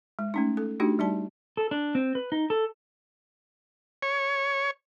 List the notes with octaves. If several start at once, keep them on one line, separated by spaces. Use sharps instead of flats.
G#3
A3 C#4 D#4
A4
A3 D4 D#4 F#4 G4
G3 D#4 D5 A5
A4
D4
C4
B4
D#4
A4
C#5